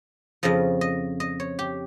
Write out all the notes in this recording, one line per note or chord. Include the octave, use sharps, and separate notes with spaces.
F2 C#3 F3 D#5
D#5
D#5
C#5
G4